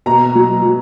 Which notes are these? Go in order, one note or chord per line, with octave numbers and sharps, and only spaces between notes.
B2 A#5
F#3
F#3